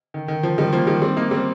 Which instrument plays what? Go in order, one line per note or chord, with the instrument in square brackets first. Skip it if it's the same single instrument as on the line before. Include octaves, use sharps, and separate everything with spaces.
[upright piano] D#3
D#3
F3
D#3 G3
F3 A#3
D#3 G3
G3 C4
A#3 D#4
G3 C4